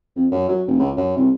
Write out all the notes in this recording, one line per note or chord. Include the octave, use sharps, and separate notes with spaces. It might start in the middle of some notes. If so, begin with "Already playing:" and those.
F2
F#2
F#3
F1
C#2
F#2
C2